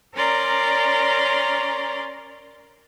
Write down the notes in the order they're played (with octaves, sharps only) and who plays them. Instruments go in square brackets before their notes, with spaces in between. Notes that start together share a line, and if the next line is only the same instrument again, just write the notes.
[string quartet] C#4 A#4 D5 A#5 C6